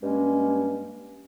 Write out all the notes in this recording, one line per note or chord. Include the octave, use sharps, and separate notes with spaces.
G2 G#3 A#3 C#4